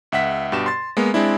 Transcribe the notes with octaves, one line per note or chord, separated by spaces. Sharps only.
C#2 E5 F#5 B6
G2 B2 G4 E7
C6 A6
G#3 A#3 B3
G#3 C4 D4 E4